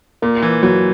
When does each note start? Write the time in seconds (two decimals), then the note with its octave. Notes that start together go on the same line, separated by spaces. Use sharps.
0.22 A#2 A#3
0.42 E3
0.63 E3 F#3